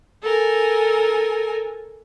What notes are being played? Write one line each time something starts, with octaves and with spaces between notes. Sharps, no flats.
A4 A#4 G#5